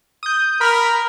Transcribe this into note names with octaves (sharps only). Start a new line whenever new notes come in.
D#6 G6
A#4 B5 F6